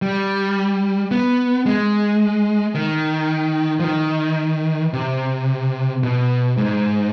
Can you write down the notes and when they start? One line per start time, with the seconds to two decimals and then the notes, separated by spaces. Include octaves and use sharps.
0.02 G3
1.11 B3
1.66 G#3
2.75 D#3
3.79 F3
3.84 D#3
4.93 C3
6.03 B2
6.57 G#2